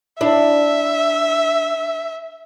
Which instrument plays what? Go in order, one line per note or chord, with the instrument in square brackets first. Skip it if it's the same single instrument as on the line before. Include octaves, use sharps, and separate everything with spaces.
[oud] D4 E4 [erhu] E5